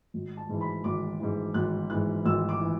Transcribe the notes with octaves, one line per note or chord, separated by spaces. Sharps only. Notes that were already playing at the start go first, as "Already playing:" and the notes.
G#1
A5
G#2 E3
B5
G#1 D6
G#2 E3
G#1 F#6
G#2 E3 F#6
G#1 E6
D6
E3